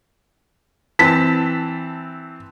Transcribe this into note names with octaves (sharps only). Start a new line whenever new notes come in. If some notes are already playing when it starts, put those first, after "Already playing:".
E3 C4 A5 B6